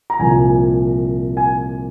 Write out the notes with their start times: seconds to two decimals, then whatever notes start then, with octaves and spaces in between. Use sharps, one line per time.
0.10 A#5
0.19 C2 A#2 F3 G#5
1.37 G#5